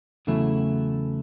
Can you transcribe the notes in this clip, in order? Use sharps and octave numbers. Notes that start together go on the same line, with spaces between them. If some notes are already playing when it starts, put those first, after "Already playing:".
E2 C#3 F#3 A3 E4